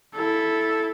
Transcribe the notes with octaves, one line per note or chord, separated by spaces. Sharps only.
E4 A4